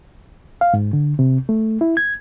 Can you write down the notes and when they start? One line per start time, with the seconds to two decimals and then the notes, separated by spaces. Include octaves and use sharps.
0.61 F5
0.74 G#2
0.93 D3
1.19 C3
1.49 A3
1.81 E4
1.97 G#6